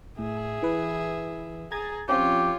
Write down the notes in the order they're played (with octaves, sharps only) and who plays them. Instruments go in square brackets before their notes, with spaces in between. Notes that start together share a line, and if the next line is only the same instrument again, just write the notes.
[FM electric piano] A2 [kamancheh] G#4 E5
[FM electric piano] E3 B4
[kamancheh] G#4 [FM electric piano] A#5 G#6 A6
[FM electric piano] F3 C4 C#4 [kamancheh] F4 C#5 [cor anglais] G4